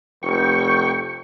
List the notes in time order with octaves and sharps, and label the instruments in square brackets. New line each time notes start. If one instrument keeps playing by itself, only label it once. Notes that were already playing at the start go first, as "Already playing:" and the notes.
[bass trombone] F1 [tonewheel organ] G5 C#6